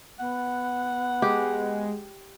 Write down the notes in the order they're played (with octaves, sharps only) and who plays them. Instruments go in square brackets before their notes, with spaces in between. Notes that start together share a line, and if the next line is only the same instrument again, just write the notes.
[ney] B3 [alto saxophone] F#5
[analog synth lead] G#3 [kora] G4